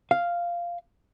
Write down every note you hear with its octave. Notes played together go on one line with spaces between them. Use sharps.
F5